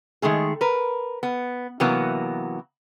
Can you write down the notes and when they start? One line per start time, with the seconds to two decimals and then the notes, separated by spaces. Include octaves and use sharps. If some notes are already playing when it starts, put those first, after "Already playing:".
0.22 D#3 G#3 A3 G#4
0.61 A#4 B4
1.23 B3
1.80 C3 E3 F#3 A#3 B3